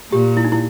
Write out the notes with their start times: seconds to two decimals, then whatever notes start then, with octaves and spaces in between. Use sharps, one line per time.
0.12 A#2 G4
0.37 E4
0.45 D#4
0.52 E4